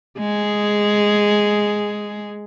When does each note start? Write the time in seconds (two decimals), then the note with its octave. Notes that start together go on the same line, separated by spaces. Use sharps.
0.19 G#3 G#4